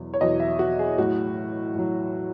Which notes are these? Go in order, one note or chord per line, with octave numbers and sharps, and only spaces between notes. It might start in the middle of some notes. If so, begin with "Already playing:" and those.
Already playing: E2 B2 F#3
C#5
E2 B2 F#3 D#5
E5
F#4
G#4
A2 F#3 F#4
A2 F#3